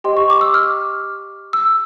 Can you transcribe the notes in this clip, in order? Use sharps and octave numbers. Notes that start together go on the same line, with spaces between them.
G4 C5 D#5 G5 C6
C#6
D6
E6
F6
E6